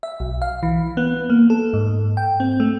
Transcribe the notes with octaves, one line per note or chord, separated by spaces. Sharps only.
E5
B1
F5
E3
B3
A#3
A4
G#2
G5
C4
A3